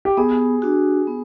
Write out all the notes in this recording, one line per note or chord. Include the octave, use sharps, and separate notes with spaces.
G4
B3 G#4
D4 F#4
B3